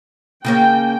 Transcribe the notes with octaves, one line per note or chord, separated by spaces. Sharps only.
C#3 A#3 C#4 G5